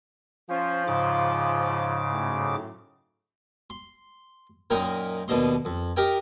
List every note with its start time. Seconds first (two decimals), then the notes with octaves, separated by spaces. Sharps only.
0.50 F3 C#4 C5
0.87 G#2 C#3 D6
2.13 F#2 A2
3.70 C6
4.70 F#2 A#2 D#4 A#4 G5
5.28 D#2 B2 D4 D#5 C6
5.65 F2
5.97 G4 A#4 D#5 G5